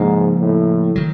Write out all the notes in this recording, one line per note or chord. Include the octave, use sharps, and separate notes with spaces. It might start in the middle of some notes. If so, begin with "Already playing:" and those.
Already playing: G#2 C#3 F3 A#3
A2
D#3 F#3